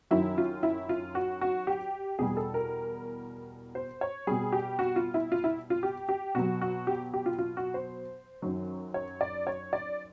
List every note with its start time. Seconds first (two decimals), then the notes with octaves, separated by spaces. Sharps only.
0.11 F#2 D#3 F#3 E4
0.38 F4
0.63 E4
0.89 F4
1.15 F#4
1.41 F#4
1.67 G4
2.19 E2 B2 G3 G#4
2.37 A4
2.54 A#4
3.75 C5
4.01 C#5
4.27 B2 G3 G#4
4.53 G4
4.79 F#4
4.96 F4
5.14 E4
5.32 F4
5.44 E4
5.70 F4
5.83 G4
6.09 G4
6.35 B2 F#3 F#4
6.61 F#4
6.87 G4
7.14 G4
7.26 F4
7.39 F4
7.57 F#4
7.74 C5
8.42 F#2 D#3 F#3
8.94 C#5
9.21 D5
9.47 C#5
9.73 D5